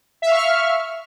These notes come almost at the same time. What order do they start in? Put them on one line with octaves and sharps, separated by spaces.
E5 F5 C#6 F6